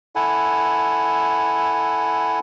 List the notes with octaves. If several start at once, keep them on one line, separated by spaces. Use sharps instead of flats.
E4 A4 F#5 G#5